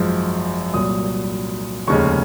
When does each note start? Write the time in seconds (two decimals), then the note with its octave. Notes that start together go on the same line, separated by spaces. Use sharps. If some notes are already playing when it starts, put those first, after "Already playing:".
Already playing: G#1 F#2 F3 G#3
0.73 C2 A#2 F#3 D#6
1.87 F1 D#2 C#3 G#3 C#4 C#6